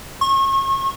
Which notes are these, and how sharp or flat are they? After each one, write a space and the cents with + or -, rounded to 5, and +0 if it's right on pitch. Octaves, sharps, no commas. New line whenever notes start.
C#6 -35